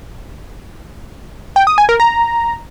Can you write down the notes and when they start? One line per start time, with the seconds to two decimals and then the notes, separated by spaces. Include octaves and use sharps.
1.56 G5
1.67 D#6
1.78 G#5
1.89 A#4
2.00 A#5